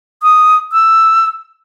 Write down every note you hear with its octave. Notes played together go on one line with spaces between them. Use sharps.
D#6
E6